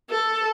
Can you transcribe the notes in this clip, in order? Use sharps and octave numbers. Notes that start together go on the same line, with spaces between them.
A4